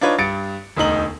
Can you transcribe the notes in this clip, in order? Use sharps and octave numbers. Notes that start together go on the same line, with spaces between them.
D4 D#4 F4 B4 C#5
G2 A6 C#7 D7
E1 D2 D#4 F#7